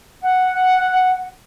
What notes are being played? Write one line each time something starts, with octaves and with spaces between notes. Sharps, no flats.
F#5